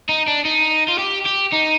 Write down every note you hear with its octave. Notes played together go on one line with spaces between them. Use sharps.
D#4
D4
D#4
F4
G4
G4
D#4